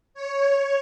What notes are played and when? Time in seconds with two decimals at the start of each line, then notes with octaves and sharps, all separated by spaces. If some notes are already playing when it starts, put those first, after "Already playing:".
0.14 C#5